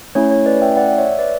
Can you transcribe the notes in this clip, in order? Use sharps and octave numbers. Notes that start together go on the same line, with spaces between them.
A3 C#4 E4 C#5
C#5
B4 D5
E5 G5
D5 F#5
C#5 E5
B4 D5